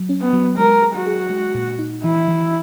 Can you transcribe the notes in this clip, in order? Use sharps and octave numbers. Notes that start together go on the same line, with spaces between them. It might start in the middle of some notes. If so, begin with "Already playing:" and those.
Already playing: F#3
C#4
B3
F#3
G#3 A#4
G#4
F#4
G#4
G#3
A#2
D#4
E3 E4
E3